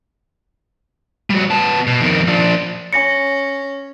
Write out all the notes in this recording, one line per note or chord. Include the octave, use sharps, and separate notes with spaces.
G3 F#4
B3 A5
B2
F2 D#3
F3 D4
C#4 G#5 A#6 C#7